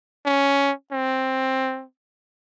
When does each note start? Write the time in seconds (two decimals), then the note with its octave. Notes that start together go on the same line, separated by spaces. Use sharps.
0.26 C#4
0.92 C4